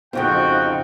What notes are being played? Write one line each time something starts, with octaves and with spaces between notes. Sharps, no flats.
F2 C#3 C4 D#4 F4 F#4 G5